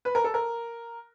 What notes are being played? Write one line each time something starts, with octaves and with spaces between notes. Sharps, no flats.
B4
A#4
A4
A#4